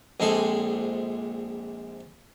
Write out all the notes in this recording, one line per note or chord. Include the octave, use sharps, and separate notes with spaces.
A#1 G#3 C4 A4 G#5